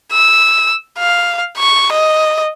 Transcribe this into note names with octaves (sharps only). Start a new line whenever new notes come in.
E6
F5
C#6
D#5